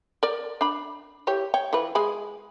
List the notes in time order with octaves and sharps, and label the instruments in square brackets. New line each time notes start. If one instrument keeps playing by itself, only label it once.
[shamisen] A#4 D5
D4 B5
E3 G4 C#5
C#5 G5
E3 F3 B4
G#3 G#4 B5